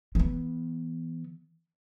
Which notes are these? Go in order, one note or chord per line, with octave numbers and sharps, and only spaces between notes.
E3 B3